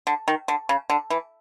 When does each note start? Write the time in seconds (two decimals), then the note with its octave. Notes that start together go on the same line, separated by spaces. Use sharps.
0.07 D3
0.28 D#3
0.48 D3
0.69 C#3
0.90 D3
1.10 E3